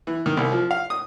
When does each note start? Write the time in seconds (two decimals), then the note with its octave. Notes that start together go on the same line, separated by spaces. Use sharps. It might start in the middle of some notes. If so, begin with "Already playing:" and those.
0.07 E3
0.26 D#3
0.37 C2
0.52 F3
0.71 F5
0.90 D#6